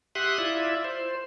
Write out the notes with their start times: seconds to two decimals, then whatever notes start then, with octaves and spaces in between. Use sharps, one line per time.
0.15 G4 E5 F#5 C6 D#6 F#6
0.38 E4 F4 D5 E5
0.84 C5